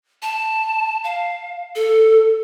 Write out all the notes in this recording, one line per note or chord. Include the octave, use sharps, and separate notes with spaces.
A5
F5
A4